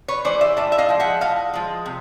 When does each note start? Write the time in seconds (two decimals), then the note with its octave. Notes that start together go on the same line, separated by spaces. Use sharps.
0.08 B4 C#5
0.25 E3 G#3 C5 D5
0.41 D5 E5
0.57 A2 D5 E5
0.72 E5
0.78 D#5 F5
0.89 F3 G#3
1.00 E5 F#5
1.21 A2 D#5 F5
1.53 F3 G#3
1.86 C3